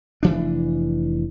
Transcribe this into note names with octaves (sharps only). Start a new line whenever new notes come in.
F1 E3 D4